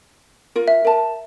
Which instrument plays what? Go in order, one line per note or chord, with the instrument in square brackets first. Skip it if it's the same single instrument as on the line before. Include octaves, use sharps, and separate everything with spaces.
[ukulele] F4 A#4
[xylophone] E5
[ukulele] A#4 A5